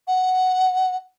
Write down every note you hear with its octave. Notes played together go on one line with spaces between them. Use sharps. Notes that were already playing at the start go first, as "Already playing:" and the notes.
F#5